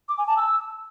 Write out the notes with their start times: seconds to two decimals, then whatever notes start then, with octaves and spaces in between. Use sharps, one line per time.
0.09 D6
0.18 G#5
0.27 A5
0.37 E6